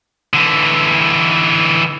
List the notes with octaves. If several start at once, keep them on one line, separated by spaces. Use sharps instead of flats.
D3 E3